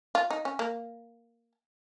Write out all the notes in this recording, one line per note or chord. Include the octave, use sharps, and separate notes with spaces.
F4
D#4
C#4
A#3